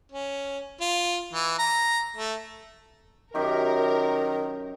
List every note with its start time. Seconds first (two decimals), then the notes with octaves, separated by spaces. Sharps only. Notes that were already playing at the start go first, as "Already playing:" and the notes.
0.12 C#4
0.81 F4
1.33 E3
1.59 A#5
2.16 A3
3.35 F#2 D#3 G4 A#4